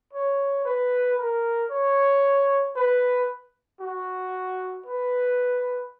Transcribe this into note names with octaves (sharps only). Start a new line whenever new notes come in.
C#5
B4
A#4
C#5
B4
F#4
B4